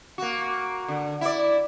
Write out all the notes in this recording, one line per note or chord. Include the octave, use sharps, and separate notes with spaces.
A#3 F#4
D3
E4 D5